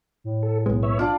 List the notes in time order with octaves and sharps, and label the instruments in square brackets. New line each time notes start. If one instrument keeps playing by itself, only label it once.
[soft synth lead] A2
[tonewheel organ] A4
[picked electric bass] B1 G#3 [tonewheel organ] B3
[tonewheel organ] B3 C#5 E5
[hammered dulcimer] D4 F4 [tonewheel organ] D5